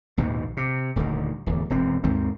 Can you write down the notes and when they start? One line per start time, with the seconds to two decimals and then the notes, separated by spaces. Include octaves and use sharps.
0.17 A#1 D#2 G#2 B2
0.57 C3
0.96 D#1 D2 B2 D#3
1.46 D1 E2
1.70 E1 F#2 C4
2.04 D#2 G#2 D#3 C4